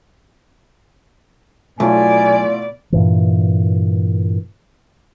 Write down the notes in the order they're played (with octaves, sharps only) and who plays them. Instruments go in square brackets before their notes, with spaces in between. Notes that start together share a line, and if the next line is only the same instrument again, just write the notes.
[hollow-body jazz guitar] B1 [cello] B2 D5 [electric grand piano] A3 E4 F4 [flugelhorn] G#5
[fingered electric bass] G2 A#2 E3